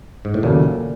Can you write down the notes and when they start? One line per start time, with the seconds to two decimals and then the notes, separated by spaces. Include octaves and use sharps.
0.25 G#2
0.34 A2
0.43 D#2 A#2 C#3 F#3 A3